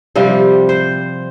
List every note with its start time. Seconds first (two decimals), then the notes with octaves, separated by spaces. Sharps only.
0.15 C3 F3 G3 C4
0.69 C5